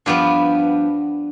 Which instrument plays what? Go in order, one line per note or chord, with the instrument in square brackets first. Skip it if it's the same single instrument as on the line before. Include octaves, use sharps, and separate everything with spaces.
[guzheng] G2 F3 B3 D4 G4